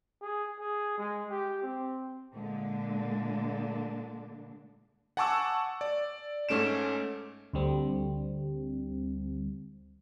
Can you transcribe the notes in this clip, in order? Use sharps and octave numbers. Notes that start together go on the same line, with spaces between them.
G#4
G#4
G#3
G4
C4
A#2 D3 G#3 D4
F#5 G#5 A5 C#6 D6 E6
D5
G#2 A3 C#4 D7 E7
D2 D3 G3 C4